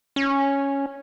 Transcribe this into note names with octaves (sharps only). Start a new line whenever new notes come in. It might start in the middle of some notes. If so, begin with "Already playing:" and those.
C#4